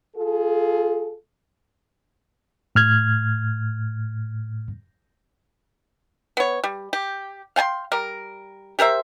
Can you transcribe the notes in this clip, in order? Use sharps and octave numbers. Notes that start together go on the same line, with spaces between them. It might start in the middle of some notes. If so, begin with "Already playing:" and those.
F4 G#4 A4
A2 F6 G#6
B3 C#5
G3
G4
F5 G5 G#5 C6
G3 A#4
G4 A#4 C5 E5